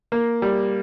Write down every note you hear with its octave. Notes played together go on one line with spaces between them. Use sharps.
A#3
G3